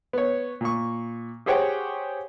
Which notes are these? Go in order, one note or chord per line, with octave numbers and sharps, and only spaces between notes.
B3 C#5
A#2 C#6
G4 G#4 C5 C#5 F#5 G5